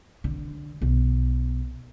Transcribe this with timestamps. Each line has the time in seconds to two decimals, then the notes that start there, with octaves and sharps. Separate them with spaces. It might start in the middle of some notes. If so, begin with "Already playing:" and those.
0.24 D3
0.82 B1